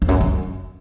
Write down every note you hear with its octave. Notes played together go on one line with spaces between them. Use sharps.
F2
F#2
F#2